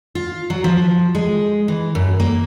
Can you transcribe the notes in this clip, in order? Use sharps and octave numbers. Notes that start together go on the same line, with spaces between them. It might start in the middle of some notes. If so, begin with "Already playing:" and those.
F4
F#3
F3
G#3
E3
F#2
A#3